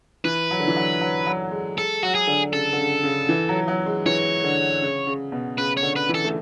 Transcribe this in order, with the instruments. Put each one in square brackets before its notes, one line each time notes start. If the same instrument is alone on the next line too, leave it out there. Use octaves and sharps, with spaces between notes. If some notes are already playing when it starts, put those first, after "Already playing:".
[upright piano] E3 [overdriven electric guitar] B4
[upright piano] F#3
D3
E3
F#3
F#3
F#3
G#3
[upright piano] G#3 [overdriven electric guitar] A4
[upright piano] F#3 [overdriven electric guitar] F#4
[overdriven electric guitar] G#4
[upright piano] D3
[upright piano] C#3 [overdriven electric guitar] A4
[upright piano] D3
C#3
C#3
E3
F#3
F#3
G#3
[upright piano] E3 [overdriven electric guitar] C#5
[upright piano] D3
C#3
C#3
B2
[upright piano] C#3 [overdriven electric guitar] B4
[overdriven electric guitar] C#5
[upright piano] D3
[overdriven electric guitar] B4
[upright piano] E3
[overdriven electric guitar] A4
[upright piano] A3